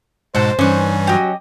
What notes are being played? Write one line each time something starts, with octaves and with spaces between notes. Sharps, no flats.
G#2 B2 G#3 A4 C5 F#5
G2 E3 G3 C#4 D#4 F#6
F#3 G4 D#5